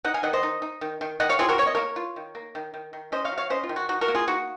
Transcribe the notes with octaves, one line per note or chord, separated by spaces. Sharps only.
D#4 D#5 F#5
F5 G#5
D#3 D#5 F#5
C5 D#5
D#4
D#4
D#3
D#3
D#3 D#5 F#5
C#5 F5
C4 F4 G#4
F#4 A#4
A#3 C#5
D#5
A#3 A#4 C#5
F4
D#3
A#3
D#3
D#3
D#3
C#4 C5 D#5
C#5 F5
F#3
C#5 F5
C#4 C5 D#5
F4
D#3
F#4
D#4 F#4
F#4 A#4
A#3
F4 G#4
D#4 F#4